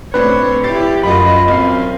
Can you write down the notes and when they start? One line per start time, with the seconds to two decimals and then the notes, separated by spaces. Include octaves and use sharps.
0.14 A2 C4 D4 B4 C#5
0.64 E4 G4 A6 C7
1.03 F#2 F4 F#4 D#5 B5
1.48 B1 C4 F6 C7